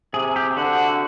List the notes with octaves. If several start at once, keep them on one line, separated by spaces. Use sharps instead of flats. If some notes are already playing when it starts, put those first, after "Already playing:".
C3 G#4
G4
D3 F#4